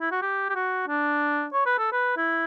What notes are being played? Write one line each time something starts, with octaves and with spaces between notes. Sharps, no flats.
E4
F#4
G4
G4
F#4
D4
C#5
B4
A4
B4
E4